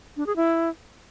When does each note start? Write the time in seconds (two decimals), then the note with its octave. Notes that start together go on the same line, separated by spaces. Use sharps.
0.17 D4
0.27 G#4
0.36 E4